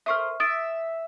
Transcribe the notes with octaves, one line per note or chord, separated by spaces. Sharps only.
A#4 C5 E5 C#6 D#6 F6
E5 D#6 A6 D7